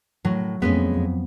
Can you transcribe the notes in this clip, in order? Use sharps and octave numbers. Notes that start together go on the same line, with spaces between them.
A2 F#3
F2 G#3 A3 B3 C#4